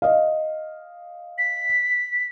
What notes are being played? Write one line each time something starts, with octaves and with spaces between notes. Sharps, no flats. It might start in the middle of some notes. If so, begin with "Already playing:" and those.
D#5 F5
B6